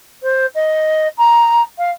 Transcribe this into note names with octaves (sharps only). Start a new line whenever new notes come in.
C5
D#5
A#5
F5